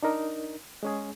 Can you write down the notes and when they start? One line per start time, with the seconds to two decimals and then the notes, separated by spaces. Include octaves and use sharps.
0.03 D4 D#4 A#4
0.83 G#3 C#4 G#4